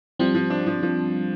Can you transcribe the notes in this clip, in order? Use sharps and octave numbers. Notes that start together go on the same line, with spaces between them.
F3 G3 C4
F3
D4
F3
F3